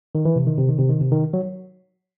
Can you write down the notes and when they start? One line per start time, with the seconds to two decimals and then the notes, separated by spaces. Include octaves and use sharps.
0.15 D#3
0.25 E3
0.36 C3
0.47 D#3
0.57 C3
0.69 D#3
0.79 C3
0.89 D#3
1.01 C3
1.12 D#3
1.33 F#3